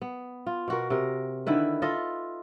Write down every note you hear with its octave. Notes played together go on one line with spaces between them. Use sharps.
B3
F4
B2 F#4 A#4
C3 A#4
D3 D#3 E4 B4
F4 A4 D#5 E5